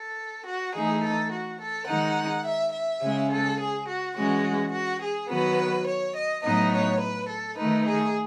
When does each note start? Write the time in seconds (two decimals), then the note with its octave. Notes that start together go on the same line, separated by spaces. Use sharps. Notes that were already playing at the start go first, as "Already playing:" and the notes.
Already playing: A4
0.46 F#4
0.74 E3 A3 D#4 G#4
1.03 A4
1.32 F#4
1.60 A4
1.88 D#3 G#3 D#4 F#5
2.45 E5
2.73 E5
3.01 C#3 G#3 C#4
3.30 A4
3.59 G#4
3.87 F#4
4.16 E3 G#3 C#4 F#4
4.72 F#4
5.01 G#4
5.29 D#3 F#3 B3 B4
5.87 C#5
6.15 D#5
6.43 A2 F#3 B3 D#4 D#5
6.71 C#5
7.00 B4
7.28 A4
7.57 D#3 A3 D#4 B4
7.85 G#4